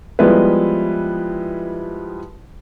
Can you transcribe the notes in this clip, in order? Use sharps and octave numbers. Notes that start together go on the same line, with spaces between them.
F3 G3 G#3 B3 E4 B4